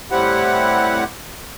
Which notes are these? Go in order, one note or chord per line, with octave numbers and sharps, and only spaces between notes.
A2 G3 C4 E4 G4 F#5